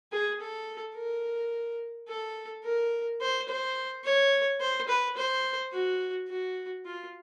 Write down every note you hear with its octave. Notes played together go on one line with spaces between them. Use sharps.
G#4
A4
A#4
A4
A#4
C5
C5
C#5
C5
B4
C5
F#4
F#4
F4